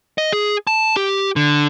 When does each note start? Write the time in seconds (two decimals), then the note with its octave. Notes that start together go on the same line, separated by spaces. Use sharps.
0.18 D#5
0.33 G#4
0.67 A5
0.97 G4
1.36 D3